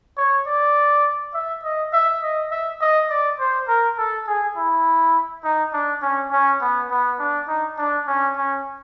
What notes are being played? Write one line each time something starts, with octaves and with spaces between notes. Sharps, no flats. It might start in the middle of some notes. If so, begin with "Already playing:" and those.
C#5
D5
E5
D#5
E5
D#5
E5
D#5
D5
C5
A#4
A4
G#4
E4
D#4
D4
C#4
C#4
B3
B3
D4
D#4
D4
C#4
C#4